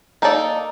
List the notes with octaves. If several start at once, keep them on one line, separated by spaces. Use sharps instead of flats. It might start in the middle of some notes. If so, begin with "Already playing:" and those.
A#3 D#4 A4 D5